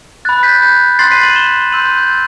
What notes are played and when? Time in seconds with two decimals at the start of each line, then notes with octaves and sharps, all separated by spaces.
0.25 B5 F#6 A6
0.43 G6 B6
0.62 G6 B6
0.99 C6 F#6 A6 C7
1.11 B6 D#7
1.23 D#7 F#7
1.35 E7 G7
1.72 C6 E6 G6 D#7 F#7
1.85 G6
1.97 G6
2.10 A6